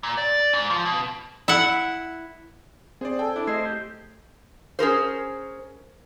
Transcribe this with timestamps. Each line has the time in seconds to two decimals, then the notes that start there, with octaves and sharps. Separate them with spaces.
0.03 A#2
0.18 D5
0.53 G#2
0.70 F3
0.85 B2
1.48 E4 F#5
3.01 C4 G#4 C5 D5
3.19 A4 G5 G#5
3.36 D4 E4
3.47 A3 G#4 C5 D#5 E6
3.65 G4
4.79 C#4 G#4 A#4 C5